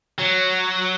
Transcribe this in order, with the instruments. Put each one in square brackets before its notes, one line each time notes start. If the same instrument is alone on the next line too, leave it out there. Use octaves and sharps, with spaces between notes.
[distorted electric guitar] F#3